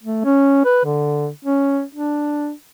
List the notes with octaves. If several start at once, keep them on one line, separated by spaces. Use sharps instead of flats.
A3
C#4
B4
D3
C#4
D4